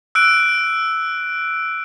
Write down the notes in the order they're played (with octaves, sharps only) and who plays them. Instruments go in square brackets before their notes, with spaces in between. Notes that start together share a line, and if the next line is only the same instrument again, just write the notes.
[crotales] E6 F#6 D7